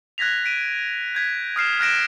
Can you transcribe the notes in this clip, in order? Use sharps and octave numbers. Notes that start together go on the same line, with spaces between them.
F#6 G#6 A#6 B6 F7
B6 D7 D#7
G6 G#6 B6
D#6 F6 C7 E7
F6 F#6 G#6 A#6 D7 E7